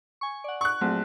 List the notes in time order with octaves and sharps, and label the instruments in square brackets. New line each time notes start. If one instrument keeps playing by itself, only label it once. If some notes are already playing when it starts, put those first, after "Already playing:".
[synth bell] G#5 C#6
D5 F#5
[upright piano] C#6 F#6
[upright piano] A#1 [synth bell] F#3 A3 C4